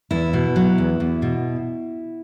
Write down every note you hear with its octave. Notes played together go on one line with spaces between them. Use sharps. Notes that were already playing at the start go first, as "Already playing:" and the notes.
E2 E4
B2
F#3
E2
E2
B2